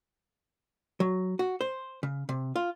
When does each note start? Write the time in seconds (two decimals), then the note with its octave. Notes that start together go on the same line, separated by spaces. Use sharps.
1.00 F#3
1.39 F#4
1.61 C5
2.03 C#3
2.29 C3
2.56 F4